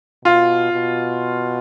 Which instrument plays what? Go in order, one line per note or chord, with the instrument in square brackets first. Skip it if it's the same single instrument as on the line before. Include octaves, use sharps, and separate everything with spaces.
[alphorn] B2 [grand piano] F4
[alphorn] B2